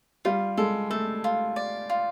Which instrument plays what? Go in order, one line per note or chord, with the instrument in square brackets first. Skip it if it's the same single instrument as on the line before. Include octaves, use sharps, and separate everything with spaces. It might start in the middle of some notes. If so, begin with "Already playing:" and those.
[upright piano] G3 [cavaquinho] F4
[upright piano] G#3 [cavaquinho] A4
[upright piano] A3 [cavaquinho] A4
[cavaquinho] F4
D5
F4